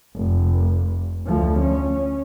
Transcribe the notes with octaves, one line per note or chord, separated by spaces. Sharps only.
F1
D2 F3
C#4